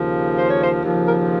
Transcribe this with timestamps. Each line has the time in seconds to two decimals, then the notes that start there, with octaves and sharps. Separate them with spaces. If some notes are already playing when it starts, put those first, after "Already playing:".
Already playing: D#2 C#3 F3
0.37 C5
0.50 C#5
0.63 C5
0.84 D#2 C#3 F3
1.07 A#4